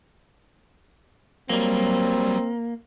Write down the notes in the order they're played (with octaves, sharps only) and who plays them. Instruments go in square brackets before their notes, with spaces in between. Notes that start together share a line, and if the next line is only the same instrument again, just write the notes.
[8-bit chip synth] F#3 G3 [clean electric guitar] A#3 [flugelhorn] C4